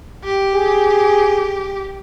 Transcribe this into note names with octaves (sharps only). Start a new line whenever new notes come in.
G4
G#4